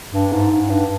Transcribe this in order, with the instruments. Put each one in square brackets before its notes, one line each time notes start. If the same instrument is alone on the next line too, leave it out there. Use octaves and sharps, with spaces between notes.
[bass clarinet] G2
G#2
G#2
G2